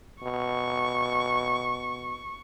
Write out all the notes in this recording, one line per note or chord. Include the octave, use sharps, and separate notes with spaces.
B2 C#6